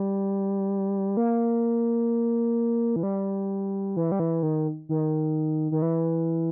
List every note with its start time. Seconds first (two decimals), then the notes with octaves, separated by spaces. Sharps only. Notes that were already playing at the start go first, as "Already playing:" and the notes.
Already playing: G3
1.17 A#3
2.96 E3
3.03 G3
3.97 E3
4.12 G3
4.20 E3
4.43 D#3
4.89 D#3
5.72 D#3
5.82 E3